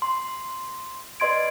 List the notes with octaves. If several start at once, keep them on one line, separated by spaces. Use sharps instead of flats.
C6
B4 D5 D#5 C6 G#6 D7